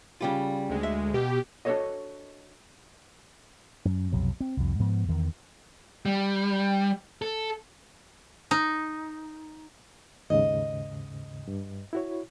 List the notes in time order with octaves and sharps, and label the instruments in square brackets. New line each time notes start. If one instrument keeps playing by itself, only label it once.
[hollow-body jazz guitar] C#3 G3 F4
[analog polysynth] D2 G#3
[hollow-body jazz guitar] E5
[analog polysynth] B2 G4
[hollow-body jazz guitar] D4 F#4 G4 A4 C#5 D#5
[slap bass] F#2
B1 F2 C3 F#3
C4
C2 F2
G#2 F3 B3
E2 D#3
[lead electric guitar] G3
A4
[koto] D#4
[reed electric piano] D#2 G#2 C#3 [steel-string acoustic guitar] D#5
[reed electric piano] G2
E4 F#4 C#5